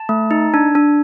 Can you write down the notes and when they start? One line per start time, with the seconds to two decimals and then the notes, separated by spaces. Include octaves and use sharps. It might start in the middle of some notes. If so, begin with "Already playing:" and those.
Already playing: A5
0.09 A3
0.31 D#4
0.54 D4
0.75 D4